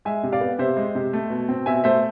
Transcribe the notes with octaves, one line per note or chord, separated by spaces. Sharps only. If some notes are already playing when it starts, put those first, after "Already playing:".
G#3 E5 G#5
C3
D5 F5
B3
C3 C5 E5
G#3
C3
A3
B2
C4
B2 E5 G#5
A3 C5 E5